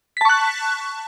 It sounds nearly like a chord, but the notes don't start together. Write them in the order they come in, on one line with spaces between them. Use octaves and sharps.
B6 A5 C#6 F#6